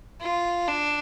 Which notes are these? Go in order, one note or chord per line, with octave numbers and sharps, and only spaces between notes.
F4
D4